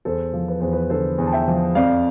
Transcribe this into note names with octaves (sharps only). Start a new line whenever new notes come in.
E2 A4 C5
F3
B4
E2 C5
B4
D3 A4 C5
E2
A5
E5 G5
F3
F2 D5 F5